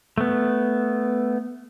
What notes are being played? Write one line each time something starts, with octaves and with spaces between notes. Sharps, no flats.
A3 B3